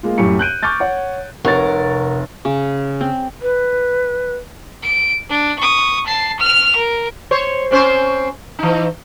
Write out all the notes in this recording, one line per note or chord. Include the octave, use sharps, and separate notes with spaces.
G#3 A#3 F4
F#2 A2 G4 C#6 C#7
F#6 G6 D7 D#7
C#6 D6 F6 G6 A6
C#5 F#5
F1 C3 A#4 C#5 F#5 C#6 A6
C#3
C4
B4
D7
D4
C#6 D#6
A5 C7
F6 F7
A#4
C5 C#5
C4 C#4 C5
E3 D#4